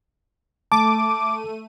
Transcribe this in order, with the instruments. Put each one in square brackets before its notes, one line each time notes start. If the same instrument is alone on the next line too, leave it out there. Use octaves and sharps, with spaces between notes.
[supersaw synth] A3 D#7 [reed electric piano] A5 [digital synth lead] D6